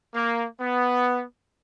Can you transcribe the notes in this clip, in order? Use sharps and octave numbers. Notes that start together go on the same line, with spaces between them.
A#3
B3